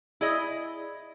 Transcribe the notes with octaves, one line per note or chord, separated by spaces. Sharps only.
E4 G#4 D5 D#5